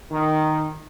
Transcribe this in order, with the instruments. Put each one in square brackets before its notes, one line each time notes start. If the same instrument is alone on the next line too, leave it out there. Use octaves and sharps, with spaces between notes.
[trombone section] D#3